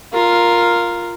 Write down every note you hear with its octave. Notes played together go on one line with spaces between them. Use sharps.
F4 A#4